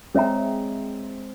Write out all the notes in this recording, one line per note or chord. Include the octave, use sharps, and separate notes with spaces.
G#3 C4 G#4 C#5 E5 G5 A#5